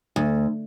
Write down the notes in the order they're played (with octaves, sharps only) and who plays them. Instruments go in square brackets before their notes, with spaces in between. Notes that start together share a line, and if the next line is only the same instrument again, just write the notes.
[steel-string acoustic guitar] D2